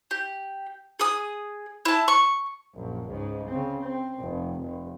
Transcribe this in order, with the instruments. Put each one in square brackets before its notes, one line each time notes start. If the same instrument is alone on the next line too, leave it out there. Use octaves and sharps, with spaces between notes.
[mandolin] G4
G#4 D#6
E4 A5
C#6
[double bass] A#1 F#2
C#2 G#2
C#3 C4
C4
F1
F1